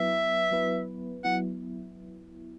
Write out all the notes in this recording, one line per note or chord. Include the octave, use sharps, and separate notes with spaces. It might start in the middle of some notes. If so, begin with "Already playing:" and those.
Already playing: F#3 B3 E4 B4 E5
F#3 B3 E4 B4
F#3 B3 E4 F#5